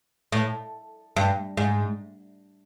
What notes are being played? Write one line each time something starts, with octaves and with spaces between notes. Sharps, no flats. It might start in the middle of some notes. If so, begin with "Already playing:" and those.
A2
G2
G#2